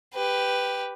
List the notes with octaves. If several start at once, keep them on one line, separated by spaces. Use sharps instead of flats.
G4 B4